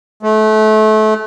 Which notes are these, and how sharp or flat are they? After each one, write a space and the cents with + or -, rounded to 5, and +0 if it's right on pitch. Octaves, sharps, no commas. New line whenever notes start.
A3 -30